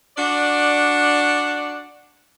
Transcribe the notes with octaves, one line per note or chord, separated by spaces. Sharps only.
D4 F#4 D5